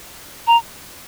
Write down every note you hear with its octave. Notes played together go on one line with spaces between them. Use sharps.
A#5